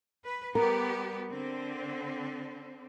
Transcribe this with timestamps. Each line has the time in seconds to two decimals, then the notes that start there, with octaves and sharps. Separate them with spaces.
0.25 B4
0.55 G3 B3 G4 A#4
1.30 D3 C4